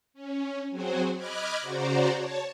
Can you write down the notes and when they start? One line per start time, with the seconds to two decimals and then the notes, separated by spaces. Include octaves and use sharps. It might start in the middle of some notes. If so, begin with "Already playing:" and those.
0.14 C#4
0.70 F#3 C4 F#4 G#4 C5
1.16 D#5 B5 D6 F6 F#6 G#6
1.61 C#3 F#4 C5 D5 A#5
2.14 C#5 A5